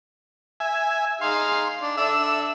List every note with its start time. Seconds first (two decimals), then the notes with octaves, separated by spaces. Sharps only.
0.60 E5 G#5
1.21 D#4 G#4 F5 C6
1.82 D4
1.97 D4 A4 E5 E6